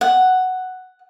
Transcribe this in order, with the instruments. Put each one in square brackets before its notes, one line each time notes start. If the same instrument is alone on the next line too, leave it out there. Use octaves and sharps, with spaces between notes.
[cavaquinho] F#5